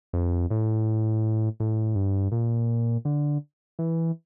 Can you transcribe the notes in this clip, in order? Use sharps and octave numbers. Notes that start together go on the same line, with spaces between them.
F2
A2
A2
G2
A#2
D3
E3